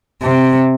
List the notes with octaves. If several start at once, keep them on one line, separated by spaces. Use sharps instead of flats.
C3